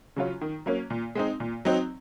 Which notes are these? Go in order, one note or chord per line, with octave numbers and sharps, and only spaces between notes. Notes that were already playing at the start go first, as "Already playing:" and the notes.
C#3 F#3 C#4 F4
D#3
F#3 A#3 C#4
A#2
G#3 C4 D#4
A#2
F#3 C4 D#4